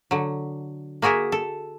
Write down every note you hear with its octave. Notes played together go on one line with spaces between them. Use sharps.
D3 F#3
A#3 F#4 G#4 A#4 E5
A4